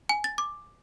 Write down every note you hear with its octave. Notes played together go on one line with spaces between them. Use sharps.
G#5
A6
D6